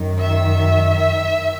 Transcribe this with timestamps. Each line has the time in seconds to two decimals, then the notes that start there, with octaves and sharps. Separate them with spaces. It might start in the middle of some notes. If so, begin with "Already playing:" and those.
Already playing: F#2 D#3
0.19 E5